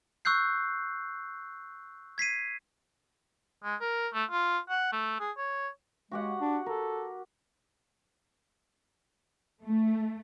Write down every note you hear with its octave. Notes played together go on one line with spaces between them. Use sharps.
C#6 E6 F#6 G6 C7
G#6 B6 C7 D#7
G#3
A#4
A3
F4
F#5
A3
G#4
C#5
G#3 F#4 G4 F#5
D4
A4 A#4
A3